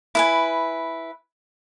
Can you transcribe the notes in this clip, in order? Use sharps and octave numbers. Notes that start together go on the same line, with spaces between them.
E4 B4 G#5